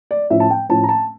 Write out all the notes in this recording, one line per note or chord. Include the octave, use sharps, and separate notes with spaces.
D5
A2 F3 C#4 E5
A5
G5
A2 F3 C#4 A5
A#5
A5